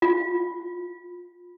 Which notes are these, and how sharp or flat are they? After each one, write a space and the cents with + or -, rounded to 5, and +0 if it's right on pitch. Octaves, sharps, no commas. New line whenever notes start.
F4 +20